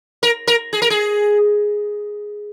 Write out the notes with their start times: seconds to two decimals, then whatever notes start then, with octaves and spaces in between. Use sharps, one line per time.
0.23 A#4
0.47 A#4
0.73 G#4
0.82 A#4
0.90 G#4